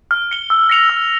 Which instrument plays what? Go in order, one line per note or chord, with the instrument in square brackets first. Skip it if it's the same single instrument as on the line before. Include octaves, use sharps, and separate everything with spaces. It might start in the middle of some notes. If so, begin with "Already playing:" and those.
[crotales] F6
C#7 G7
E6
A#6 C#7 F7
E6